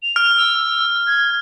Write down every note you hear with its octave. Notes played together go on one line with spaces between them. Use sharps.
F7
F6
E6
G#6